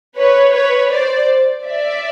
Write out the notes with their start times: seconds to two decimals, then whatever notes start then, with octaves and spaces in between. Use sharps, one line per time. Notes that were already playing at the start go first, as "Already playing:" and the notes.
0.18 B4 C#5
0.54 B4 C#5
0.92 C5 D5
1.65 D5 E5